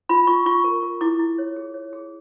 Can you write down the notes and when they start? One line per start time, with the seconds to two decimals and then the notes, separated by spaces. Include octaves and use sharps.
0.09 F4 B5
0.27 F4 C#6
0.46 F4 C#6
0.64 A#4
0.83 A#4
1.01 E4 D6
1.19 E4
1.38 C#5
1.56 G#4
1.74 C#5
1.93 G#4